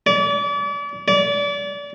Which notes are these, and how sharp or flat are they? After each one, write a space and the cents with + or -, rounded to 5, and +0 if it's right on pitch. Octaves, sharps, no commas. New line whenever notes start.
D5 -40
D5 -35